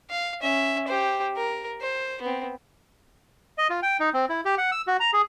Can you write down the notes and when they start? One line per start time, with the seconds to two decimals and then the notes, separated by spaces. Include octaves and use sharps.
0.11 F5
0.42 C#4 E5
0.88 G4 C5
1.37 A#4
1.81 C5
2.22 B3 C4
3.58 D#5
3.70 F4
3.82 G5
4.00 D#4
4.14 C4
4.29 E4
4.45 G4
4.58 F#5
4.72 E6
4.88 F#4
5.00 A#5
5.13 G#4